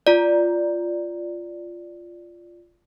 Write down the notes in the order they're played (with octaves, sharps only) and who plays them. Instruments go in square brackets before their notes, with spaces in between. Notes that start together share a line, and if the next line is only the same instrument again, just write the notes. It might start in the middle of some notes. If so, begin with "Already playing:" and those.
[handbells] F4 D5